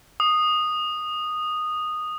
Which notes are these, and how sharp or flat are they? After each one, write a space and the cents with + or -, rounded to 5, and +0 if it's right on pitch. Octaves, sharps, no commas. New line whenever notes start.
D#6 -10